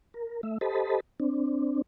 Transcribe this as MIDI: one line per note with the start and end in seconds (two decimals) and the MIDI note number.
0.14 0.41 70
0.43 0.58 57
0.43 0.58 76
0.61 1.00 67
0.61 1.00 69
0.61 1.00 72
0.61 1.00 75
0.61 1.00 81
0.61 1.00 83
1.20 1.82 60
1.20 1.82 62